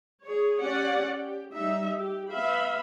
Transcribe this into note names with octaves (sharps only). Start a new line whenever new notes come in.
G#4 C#5
C#4 G4 D5 F#5
G4
G3 D#4 E5
G4
B3 E5 F5 B5